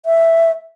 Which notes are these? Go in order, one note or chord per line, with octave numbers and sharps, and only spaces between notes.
E5